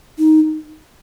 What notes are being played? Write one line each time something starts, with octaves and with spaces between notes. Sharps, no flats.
D#4